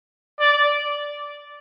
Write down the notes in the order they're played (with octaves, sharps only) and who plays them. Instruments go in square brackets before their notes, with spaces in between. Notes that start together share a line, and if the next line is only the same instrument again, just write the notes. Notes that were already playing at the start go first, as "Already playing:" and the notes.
[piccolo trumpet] D5